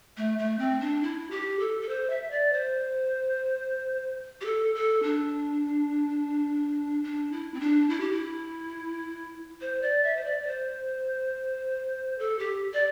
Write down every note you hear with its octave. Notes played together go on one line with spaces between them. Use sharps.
A3
A3
C4
D4
E4
G4
A4
A4
C5
E5
D5
C5
G4
A4
A4
D4
D4
E4
C4
D4
E4
G4
E4
C5
D5
E5
C5
D5
D5
C5
A4
G4
D5